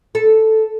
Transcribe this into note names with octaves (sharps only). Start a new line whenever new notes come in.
A4